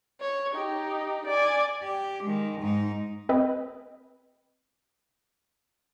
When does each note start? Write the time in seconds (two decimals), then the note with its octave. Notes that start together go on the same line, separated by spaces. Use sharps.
0.20 C#5
0.52 D#4 G4
1.26 D5 G#5
1.83 G4
2.24 D#3 G#3
2.62 G#2 D#4
3.29 C4 B4 D#5